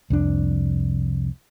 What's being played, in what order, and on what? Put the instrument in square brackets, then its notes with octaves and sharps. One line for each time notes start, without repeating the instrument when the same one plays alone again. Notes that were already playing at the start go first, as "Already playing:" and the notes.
[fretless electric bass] C2 F2 D4